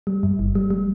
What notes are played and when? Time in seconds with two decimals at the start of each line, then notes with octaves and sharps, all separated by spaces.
0.07 G3
0.23 G2
0.39 G1
0.55 G3
0.70 G3